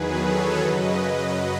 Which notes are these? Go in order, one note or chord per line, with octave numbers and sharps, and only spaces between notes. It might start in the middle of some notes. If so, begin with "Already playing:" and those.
Already playing: E2 D#3 F#3 G#4 B4
A4 C#5
F#2 C#3 F#3 B4 D#5